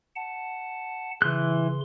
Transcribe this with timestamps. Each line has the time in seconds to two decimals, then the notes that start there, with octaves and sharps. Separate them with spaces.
0.16 F#5 A5
1.22 C#3 E3 C6 F#6